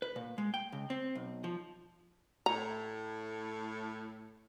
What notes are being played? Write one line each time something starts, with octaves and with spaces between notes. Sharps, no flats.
B4
A#2
G#3
G5
C#2
C4
B1
F3
A2 A#5